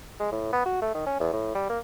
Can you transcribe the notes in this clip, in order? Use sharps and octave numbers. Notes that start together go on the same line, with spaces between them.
G#3
A2
B3
F#4
A3
D#3
C#4
E2
A2
G3
A#3